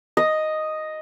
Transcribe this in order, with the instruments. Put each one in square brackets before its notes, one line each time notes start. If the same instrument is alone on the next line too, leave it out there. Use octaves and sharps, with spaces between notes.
[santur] D#5